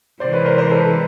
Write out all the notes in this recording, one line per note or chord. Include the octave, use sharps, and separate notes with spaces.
C3 E3 G#3 C5 D5
B4 C#5
A#4 C5
A#4 C5
A4 B4